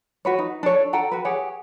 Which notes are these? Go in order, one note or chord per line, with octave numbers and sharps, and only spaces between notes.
F#4 B4 C#5
D#4
D4 A4 C#5
A4 F#5 G5 A#5
F#4 B4
G4 G#4 C#5 F#5